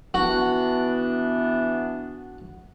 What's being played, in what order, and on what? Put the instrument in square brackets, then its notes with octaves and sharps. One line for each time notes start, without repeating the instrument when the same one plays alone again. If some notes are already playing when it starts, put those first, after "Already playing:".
[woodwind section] E3 B3 D4 [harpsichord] F#4